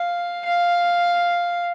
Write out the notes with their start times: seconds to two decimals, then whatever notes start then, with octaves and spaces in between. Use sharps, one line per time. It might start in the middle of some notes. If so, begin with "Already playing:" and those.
Already playing: F5
0.45 F5